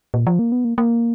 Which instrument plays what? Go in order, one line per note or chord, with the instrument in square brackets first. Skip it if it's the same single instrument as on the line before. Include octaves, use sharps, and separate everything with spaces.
[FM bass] A#2
F3
A#3
B3
A#3
A#3